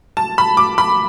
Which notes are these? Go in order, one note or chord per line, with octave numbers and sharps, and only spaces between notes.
A5
B5
D6
B5